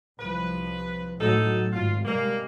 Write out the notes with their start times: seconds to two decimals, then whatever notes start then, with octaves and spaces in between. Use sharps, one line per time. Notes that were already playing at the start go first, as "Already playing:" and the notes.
0.18 C2 F3 B4
1.18 A2 F#3 D#4 A4
1.73 G#1 F4
2.04 C3 G3 G#3 A#3